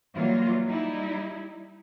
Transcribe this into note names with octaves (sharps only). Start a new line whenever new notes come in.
E3 F#3 G3 A#3 F4
G3 D#4 E4